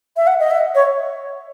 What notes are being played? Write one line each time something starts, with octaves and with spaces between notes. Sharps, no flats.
E5
F#5
D#5
E5
C#5